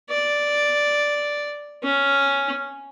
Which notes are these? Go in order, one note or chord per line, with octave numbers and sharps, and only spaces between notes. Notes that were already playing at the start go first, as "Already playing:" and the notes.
D5
C#4